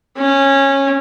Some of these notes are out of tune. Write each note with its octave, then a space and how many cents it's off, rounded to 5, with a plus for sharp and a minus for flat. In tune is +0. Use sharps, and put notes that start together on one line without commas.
C#4 -15